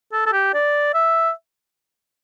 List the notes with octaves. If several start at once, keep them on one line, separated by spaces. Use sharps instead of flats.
A4
A4
G4
D5
E5